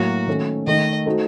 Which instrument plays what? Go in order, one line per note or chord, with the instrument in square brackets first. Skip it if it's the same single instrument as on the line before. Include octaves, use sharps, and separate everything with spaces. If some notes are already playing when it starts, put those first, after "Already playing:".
Already playing: [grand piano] A2 F#3 A#3 [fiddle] F#4
[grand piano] D#3 A3 C#4 A4
[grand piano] D#3 A3 D#4 [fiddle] D#5
[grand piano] A3 D#4 F#4 A4 C5